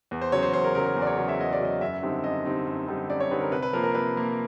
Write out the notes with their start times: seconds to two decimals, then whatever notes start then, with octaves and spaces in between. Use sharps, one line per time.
0.11 E2
0.22 C5
0.32 C#3 F#3 C#5
0.43 C5
0.53 E2 C5
0.64 A#4
0.75 C#3 A#4
0.79 F#3
0.86 A#4
0.96 E2
1.02 D5
1.07 C#5
1.17 C#3 F#3
1.28 E5
1.39 E2 D#5
1.53 D5
1.60 C#3 F#3 D#5
1.81 F#2 E5
2.03 D3 G3 C4 D#4
2.24 F#2 D#5
2.45 D3 G3 C4 D#4
2.67 F#2
2.88 D3 G3 C4 D#4
3.09 F#2 D5
3.20 C#5
3.31 D3 G3 C4 D#4 B4
3.41 A#4
3.52 C3 B4
3.62 B4
3.73 F3 A#3 A#4
3.84 A#4
3.94 C3 B4
4.16 F3 A#3